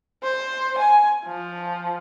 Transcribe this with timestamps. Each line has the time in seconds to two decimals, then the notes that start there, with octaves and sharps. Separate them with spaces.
0.23 C5
0.79 G#5
1.26 F3